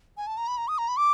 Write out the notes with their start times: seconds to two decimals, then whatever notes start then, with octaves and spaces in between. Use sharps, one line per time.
0.17 G#5
0.27 A5
0.37 A#5
0.48 B5
0.58 A#5
0.68 D#6
0.78 A#5
0.88 B5
0.98 D6